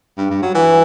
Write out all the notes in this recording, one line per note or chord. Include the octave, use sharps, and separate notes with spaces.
G2
G2
F#3
E3